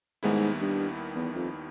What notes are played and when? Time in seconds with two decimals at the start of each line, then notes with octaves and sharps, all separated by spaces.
0.23 D#2 G#2 D#3 G3 B3 E4
0.61 G2
1.16 E2
1.35 F2